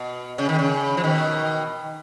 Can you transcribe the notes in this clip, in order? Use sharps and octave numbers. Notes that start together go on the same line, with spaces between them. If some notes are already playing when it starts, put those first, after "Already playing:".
Already playing: B2
C#3
D#3
C#3
F3
B2 D#3